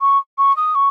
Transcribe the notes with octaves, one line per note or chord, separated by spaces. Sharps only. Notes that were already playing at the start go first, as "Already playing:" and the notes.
C#6
C#6
D#6
C#6